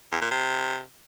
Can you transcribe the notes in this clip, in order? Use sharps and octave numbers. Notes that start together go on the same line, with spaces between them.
E2
A#2
C3